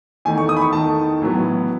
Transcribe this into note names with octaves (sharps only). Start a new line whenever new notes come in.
E2 D#3 A3 G#5
C#6
D#6
B5
C#6
E2 D#3 A3 A5
A1 A2 F#3 B3